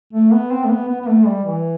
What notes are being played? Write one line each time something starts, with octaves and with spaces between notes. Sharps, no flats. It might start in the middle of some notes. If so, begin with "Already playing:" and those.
A3
B3
C4
A3
B3
B3
B3
A3
G3
E3